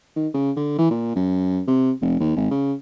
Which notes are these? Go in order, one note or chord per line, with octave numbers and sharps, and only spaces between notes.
D#3
C#3
D3
E3
A#2
F#2
C3
F1
D#2
G#1
C#3